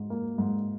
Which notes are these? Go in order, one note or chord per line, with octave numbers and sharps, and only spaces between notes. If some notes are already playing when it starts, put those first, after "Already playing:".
Already playing: G#2
A#3
G#2